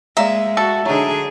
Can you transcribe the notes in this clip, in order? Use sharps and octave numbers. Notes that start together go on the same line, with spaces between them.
G#3 A#3 D5 E5 F5 A#5
F#4 A4
D3 F#3 D4 D#4 G#4